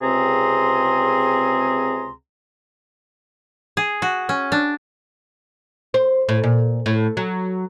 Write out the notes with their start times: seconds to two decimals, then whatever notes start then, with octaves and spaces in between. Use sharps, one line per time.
0.02 C#2 C3 C4 G#4 A#5 C6
3.77 G#4
4.02 F#4
4.29 C#4
4.52 D4
5.94 C5
6.29 A2
6.43 A#2
6.86 A2
7.17 F#3